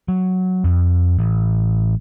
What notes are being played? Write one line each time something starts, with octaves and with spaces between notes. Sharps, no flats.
F#3
F2
A1